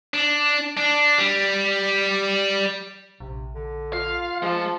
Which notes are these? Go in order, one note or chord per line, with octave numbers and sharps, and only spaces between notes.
D4
D4
G3
A#1 C3
D3
F4 F5
F3 G#3 A5